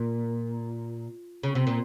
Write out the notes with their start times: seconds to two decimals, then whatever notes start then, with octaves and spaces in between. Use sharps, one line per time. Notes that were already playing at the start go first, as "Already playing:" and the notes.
Already playing: A#2
1.43 C#3
1.55 C3
1.67 A#2